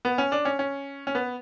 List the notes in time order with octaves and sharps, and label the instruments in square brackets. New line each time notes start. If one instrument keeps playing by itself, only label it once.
[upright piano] B3
C#4
D4
C#4
C#4
C#4
B3